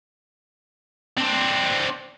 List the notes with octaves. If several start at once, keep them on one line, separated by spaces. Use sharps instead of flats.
C4 D4